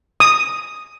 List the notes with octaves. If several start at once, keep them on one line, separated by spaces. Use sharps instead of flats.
D#6